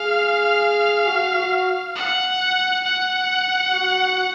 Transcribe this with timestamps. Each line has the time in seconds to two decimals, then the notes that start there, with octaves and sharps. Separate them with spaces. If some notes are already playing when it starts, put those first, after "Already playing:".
Already playing: G#4 F5
1.06 F#4
1.37 F#4
1.95 F#5
2.84 F#5
3.72 F#4